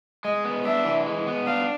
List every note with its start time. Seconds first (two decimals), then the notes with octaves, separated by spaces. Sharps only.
0.24 G#3 D#5
0.44 B3
0.65 D4 E5
0.85 E3
1.06 G#3
1.27 B3
1.47 D4 F5